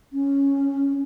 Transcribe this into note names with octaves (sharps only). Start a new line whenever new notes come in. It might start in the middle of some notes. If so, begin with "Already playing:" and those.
C#4